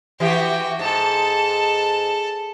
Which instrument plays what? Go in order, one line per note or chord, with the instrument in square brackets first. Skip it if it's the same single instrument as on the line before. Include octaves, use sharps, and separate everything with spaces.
[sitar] E3 G4 [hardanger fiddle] F#4 G5
[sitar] G#2 [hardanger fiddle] A4 A5